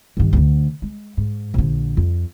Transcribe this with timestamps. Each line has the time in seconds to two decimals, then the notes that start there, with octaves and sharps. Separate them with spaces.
0.17 G2 D#3
0.33 D2 D3
0.82 G#3
1.17 G#2
1.54 A#1 D3
1.97 F2